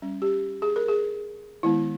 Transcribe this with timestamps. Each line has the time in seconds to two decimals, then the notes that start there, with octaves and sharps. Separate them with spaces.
0.02 G3 C#4
0.22 G4
0.62 G#4
0.76 A#4
0.88 G#4
1.63 D#3 G#3 B3 E4